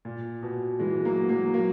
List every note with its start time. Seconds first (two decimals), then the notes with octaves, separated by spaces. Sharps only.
0.05 A#2
0.43 B2
0.79 E3 G#3
1.05 F#3 A#3
1.29 F#3 A#3
1.54 F#3 A#3